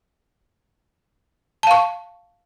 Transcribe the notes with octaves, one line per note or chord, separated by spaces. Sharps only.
F5 A5 C#6